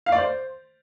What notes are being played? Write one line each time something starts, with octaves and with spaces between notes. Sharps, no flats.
F5
D5
C5